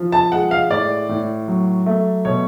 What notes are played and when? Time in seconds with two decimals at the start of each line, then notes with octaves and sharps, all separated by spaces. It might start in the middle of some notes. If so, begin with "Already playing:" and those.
Already playing: F3
0.12 A5
0.32 G#3 F#5
0.51 F5
0.70 A2 D5
1.09 A2
1.48 F#3
1.86 A3
2.25 B2 C#5